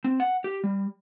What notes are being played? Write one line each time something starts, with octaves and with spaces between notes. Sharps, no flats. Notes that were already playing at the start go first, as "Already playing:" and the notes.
C4
F#5
G4
G3